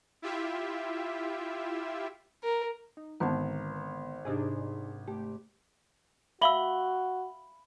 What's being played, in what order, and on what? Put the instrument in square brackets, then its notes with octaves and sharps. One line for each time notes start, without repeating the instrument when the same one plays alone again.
[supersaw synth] E4 F4 G4 E5
[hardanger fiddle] A#4
[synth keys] D#4
[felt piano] G#1 [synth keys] D3 B3 [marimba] B4 F#5 A5
[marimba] G#2 C3 G4 [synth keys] D4 D#4 G#4
[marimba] A3 [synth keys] G4
[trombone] F#4 [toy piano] E5 F5 E6 [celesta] B5 F#7 G7